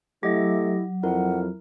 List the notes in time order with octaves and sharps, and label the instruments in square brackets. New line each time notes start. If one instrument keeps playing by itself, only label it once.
[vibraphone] F#3 [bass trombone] A3 [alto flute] E4 [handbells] G4 D#5 A#6
[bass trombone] F2 [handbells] E4 A#4 [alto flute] F#5